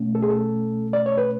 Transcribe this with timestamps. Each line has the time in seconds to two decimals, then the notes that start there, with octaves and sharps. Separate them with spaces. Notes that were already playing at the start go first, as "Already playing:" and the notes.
Already playing: B2 A3 C#4
0.15 A4
0.22 G#4
0.30 A4
0.93 D5
1.06 C#5
1.17 B4